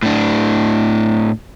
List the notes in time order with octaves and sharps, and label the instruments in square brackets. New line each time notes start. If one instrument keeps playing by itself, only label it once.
[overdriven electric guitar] A2 D4